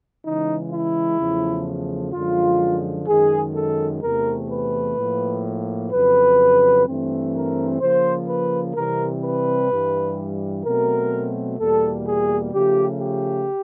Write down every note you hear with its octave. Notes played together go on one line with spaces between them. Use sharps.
C#3 E3 G#3 D#4
E4
E2 C#3 F3 A3
F#2 D3 F3 G#3 F4
F#2 D#3 G#3 G#4
A4
E2 C3 E3 A3 C4 A#4
B4
A2 F3 A#3
F2 C#3 F#3 B4
G2 E3 A3 C4
A#4
C#3 F3 A#3 C5
B4
C3 E3 G3 C4 A#4
B4
G2 E3 G3
B2 F#3 A3 C4 A#4
E2 B2 G3 A#3 A4
G#4
C#3 F3 A3 G4
G4